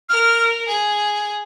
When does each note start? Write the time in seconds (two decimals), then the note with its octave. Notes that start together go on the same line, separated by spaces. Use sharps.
0.09 A#4 F6
0.68 G#4